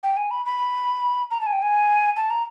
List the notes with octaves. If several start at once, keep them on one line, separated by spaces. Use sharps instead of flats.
G5
G#5
B5
B5
A#5
A5
G#5
G5
G#5
A5
A#5